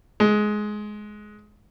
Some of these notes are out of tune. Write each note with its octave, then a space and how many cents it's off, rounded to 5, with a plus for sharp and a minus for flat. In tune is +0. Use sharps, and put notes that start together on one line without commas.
G#3 +15